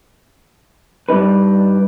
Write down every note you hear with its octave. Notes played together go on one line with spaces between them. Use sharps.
G2 G3 C#4 D#4 B4